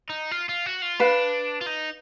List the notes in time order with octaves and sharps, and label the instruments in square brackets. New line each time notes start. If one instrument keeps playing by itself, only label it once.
[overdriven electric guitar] D#4
F4
F4
F#4
F4
[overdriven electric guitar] D4 [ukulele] B4 F5 B5
[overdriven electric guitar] F4
D#4